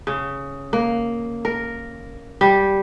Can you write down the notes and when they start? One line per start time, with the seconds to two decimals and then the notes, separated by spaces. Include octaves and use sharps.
0.07 C#3
0.73 A#3
1.45 A#4
2.41 G3